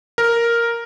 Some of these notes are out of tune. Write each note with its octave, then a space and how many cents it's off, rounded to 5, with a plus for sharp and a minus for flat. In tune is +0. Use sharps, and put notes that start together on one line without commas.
A#4 +0